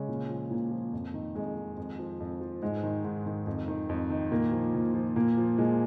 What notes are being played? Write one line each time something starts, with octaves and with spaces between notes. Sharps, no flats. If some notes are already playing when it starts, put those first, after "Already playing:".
Already playing: C#3 G#3 C#4
A#2
F3
A#2 A#3
F3
F2
D#3
F2 G#3
D#3
F2
F3
F2
F3
G#2 G#3
D#3
G#2
D#3
F2
D#3
F2
D#3
A#2 A#3
F3
A#2
F3
A#2 A#3
F3
A#2 G#3